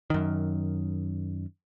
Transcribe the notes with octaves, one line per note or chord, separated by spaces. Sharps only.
F#2 D#3